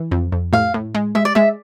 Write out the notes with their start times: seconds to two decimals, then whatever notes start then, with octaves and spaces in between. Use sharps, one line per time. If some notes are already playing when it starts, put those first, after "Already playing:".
Already playing: E3
0.11 F2
0.32 F2
0.53 A2 F5
0.74 A2
0.95 G#3
1.15 G#3 E5
1.25 D5
1.35 G#3 E5